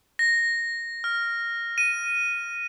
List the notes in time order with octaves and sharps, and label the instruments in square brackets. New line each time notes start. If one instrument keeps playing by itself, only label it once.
[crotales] A#6
F6
D#7